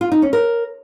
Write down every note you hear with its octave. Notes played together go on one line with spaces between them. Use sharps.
F4
D#4
C#4
A#4